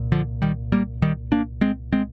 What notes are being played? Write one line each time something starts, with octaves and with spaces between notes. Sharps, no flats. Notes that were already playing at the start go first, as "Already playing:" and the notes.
Already playing: C2 A#2
D3 F3
D#3 G3
G3 A#3
D#3 G3
A#3 D4
G#3 C4
G#3 C4